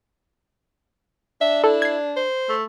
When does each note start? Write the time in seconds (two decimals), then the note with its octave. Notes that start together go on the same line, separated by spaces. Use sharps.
1.41 D4 E5
1.64 E4 A4
1.82 G#6 C7
2.17 C5
2.49 A3